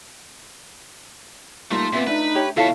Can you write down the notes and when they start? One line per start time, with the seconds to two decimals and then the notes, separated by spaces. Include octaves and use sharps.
1.71 G3 A3 A#3 D#4 F4 C6
1.93 A#2 B3 C4 E5
2.07 A3 D4 D#4 B4 E5
2.35 G4 C#5
2.57 B2 E4 F4 A4 C#5 E5 F5 A5